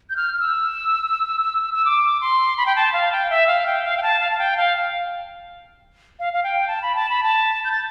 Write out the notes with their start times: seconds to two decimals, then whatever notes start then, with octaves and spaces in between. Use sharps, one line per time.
0.10 G6
0.16 F6
0.34 F6
0.40 E6
1.74 E6
1.85 D6
2.21 C6
2.58 B5
2.66 G5
2.76 A5
2.93 F5
3.12 G5
3.30 E5
3.48 F5
3.66 G5
3.84 F5
3.97 G5
4.02 A5
4.20 F5
4.31 A5
4.39 G5
4.57 F5
6.19 F5
6.33 F5
6.44 G5
6.68 A5
6.82 B5
6.95 A5
7.10 B5
7.23 A5
7.65 G6
7.72 A6